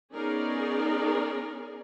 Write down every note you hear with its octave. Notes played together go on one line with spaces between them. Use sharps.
B3 C#4 D#4 G#4 A#4 D5